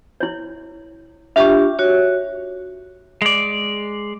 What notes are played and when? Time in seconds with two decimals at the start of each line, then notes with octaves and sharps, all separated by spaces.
0.20 E4 C#5
1.36 D4 F4 G4 E5 G5 C#6
1.79 F#4 C#5
3.22 G#3 D5